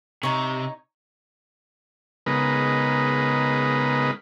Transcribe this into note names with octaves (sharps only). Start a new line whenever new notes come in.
C3 D#4 C#5
C#3 G#3 B3 D#4 A#4 B4